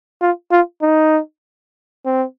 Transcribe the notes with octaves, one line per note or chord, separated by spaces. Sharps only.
F4
F4
D#4
C4